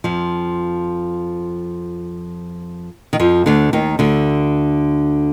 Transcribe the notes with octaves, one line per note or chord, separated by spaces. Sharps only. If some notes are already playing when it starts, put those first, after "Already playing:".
F2 F3
D#3
F2 F3
D2 D3
D#2 D#3
D2 D3